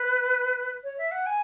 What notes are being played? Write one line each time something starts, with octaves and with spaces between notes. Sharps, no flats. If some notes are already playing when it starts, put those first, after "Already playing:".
Already playing: B4
C#5
E5
F#5
G#5